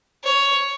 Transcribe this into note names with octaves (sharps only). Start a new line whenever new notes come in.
C#5